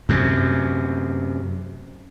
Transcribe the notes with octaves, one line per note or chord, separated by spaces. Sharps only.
F#2 C3